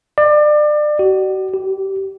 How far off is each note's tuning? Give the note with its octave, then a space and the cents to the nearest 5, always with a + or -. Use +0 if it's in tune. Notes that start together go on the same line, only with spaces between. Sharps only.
D5 +30
F#4 +45
G4 -20